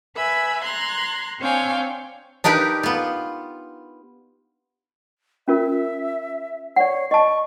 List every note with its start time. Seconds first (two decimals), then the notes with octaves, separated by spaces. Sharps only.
0.16 B4 E5 G#5 B5
0.62 A#5 C6 F#6 G#6
1.40 C4 D4 C#5 F5 G5 G#5
2.44 D4 D#4 G4 A#4 B4
2.83 B3 F4
5.48 C#4 F4 A#4 E5
6.76 C#5 D5 F#5
7.11 D#5 A5 C#6